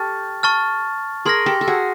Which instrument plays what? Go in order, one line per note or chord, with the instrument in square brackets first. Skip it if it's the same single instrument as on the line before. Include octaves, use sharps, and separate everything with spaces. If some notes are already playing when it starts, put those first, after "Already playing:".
Already playing: [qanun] G4 A4 [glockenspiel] A5 C#6 F6 A6
[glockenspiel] A5 C#6 F6 A6
[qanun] G#4 A#4 [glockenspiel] C6 F6 A#6
[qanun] G4 A4
A4
F#4 G#4